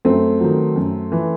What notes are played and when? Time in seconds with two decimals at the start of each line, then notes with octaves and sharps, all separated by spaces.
0.05 F#2 A3 C4
0.40 D#3 F#3
0.76 F#2
1.12 E3